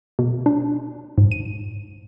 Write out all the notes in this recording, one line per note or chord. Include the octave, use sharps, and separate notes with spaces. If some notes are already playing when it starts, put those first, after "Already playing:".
B2
D4
G#2
D#7